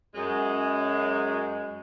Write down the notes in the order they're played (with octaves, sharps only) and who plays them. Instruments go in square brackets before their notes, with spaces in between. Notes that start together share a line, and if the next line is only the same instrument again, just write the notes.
[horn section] F#2 G#3